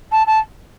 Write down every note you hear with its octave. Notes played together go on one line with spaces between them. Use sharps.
A5
A5